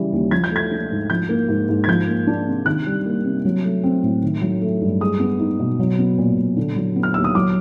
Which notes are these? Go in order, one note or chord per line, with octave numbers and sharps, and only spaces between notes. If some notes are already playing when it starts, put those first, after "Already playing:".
Already playing: C#3 E3 G3
D#2
F3 G#6
G6
A3 G#6
D4
G#2
F3 G6
A#3
G#2
G#2
G#6
F3 G6
A#3
D4
C3
D#3 F#6
G3
A#3
C3
F#3
A3
C4
A2
D#3
F#3
A3
G2
G#3 D#6
B3
D#4
B2
F#3
B3
A#2
A#2
D3
F#3
B3
F6
D#2 E6
D#6
F#3 D6